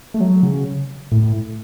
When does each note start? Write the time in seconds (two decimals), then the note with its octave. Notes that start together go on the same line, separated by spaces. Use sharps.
0.14 A3
0.20 F#3
0.43 C#3
1.12 A2